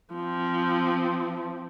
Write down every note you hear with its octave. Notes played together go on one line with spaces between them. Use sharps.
F3 C4